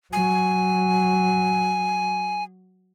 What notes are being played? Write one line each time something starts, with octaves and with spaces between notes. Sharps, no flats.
F#3 G#5